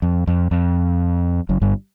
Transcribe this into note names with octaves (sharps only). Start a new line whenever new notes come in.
F2
F2
F2
F#1 F#2
G1 G2